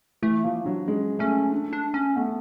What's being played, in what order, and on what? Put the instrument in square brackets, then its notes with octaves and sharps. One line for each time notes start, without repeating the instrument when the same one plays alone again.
[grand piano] E3 [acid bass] A3
[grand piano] F3 [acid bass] A#3
[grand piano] F#3 [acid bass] D4
[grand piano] G#3 [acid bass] C#4
[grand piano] A3 [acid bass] C#4
[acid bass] D4
D4
C#4
[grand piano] A3 [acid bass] B3